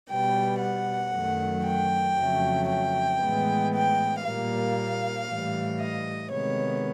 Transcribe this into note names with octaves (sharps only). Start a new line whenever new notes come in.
B2 G3 B3 G5
F#5
F#2 D#3 F#3 A3
G5
F2 C#3 F#3 A3
G5
A2 E3 G#3 B3
G5
A#2 G3 A#3 F5
A2 E3 G3
D#5
C3 D#3 G#3 B3 C#5